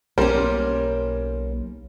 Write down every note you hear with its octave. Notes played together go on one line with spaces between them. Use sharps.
B1 G3 A#3 C#4 A#4 C5